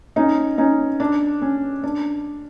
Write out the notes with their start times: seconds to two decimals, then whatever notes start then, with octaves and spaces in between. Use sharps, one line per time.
0.16 C#4 D#4
0.58 C#4 D#4
1.00 D4
1.42 C#4
1.83 D4